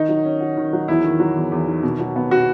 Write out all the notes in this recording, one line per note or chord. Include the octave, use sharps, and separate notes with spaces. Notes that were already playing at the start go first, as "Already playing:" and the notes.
Already playing: D#3 D#4
F#3
C#4
F#4
D#3
F#3
E2 E4
D#3
F#3
E2
E2
D#3
B2
F#3
B3
B2 F#4